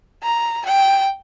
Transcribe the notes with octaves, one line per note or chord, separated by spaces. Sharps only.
A#5
G5